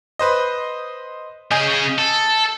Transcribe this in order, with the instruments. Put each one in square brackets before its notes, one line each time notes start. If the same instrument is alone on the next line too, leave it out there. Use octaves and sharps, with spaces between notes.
[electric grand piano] B4 C5 D#5
[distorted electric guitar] C#3 G#4 [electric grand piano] D#5 G#5 G6
[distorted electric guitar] A4